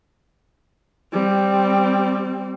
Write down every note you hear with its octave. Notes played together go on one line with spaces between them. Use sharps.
G3 C4